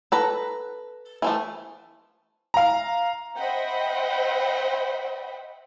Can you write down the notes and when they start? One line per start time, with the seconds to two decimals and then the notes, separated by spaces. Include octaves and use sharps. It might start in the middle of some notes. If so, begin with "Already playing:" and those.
0.12 A4 B4 A#5
1.22 E3 F3 A3
2.54 F5 A#5
3.37 C5 D#5 E5 F#5 G5 B5